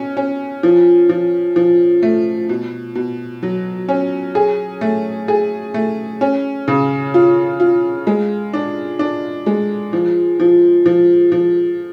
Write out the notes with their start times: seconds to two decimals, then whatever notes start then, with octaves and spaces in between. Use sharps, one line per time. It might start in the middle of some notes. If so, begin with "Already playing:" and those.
Already playing: B2 C#4
0.17 C#4
0.63 F3
1.09 F3
1.56 F3
2.03 A3
2.49 B2
2.95 B2
3.43 F#3
3.89 C#4
4.35 G#4
4.81 A3
5.28 G#4
5.74 A3
6.21 C#4
6.68 C#3
7.14 F4
7.60 F4
8.07 G#3
8.53 D4
8.99 D4
9.46 G#3
9.93 F3
10.40 F3
10.86 F3
11.32 F3